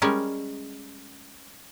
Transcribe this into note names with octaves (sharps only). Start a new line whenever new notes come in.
G3 G#3 C#4 A#4